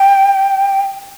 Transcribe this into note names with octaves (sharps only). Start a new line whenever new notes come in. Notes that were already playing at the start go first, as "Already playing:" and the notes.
Already playing: G5